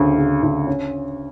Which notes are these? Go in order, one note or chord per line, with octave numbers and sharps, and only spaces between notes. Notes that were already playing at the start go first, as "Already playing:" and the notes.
Already playing: D2 C#3
C#3
D2
C#4